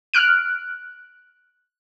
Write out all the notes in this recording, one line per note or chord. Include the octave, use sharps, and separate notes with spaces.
F6 F#6 D7